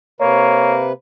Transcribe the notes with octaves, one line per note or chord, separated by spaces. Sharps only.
C3 A#3 B4 C#5